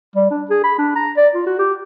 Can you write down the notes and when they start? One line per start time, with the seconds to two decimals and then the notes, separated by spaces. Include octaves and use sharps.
0.16 G3
0.30 D4
0.50 G#4
0.64 B5
0.78 D4
0.96 A#5
1.17 D5
1.34 F4
1.46 F#4
1.58 G4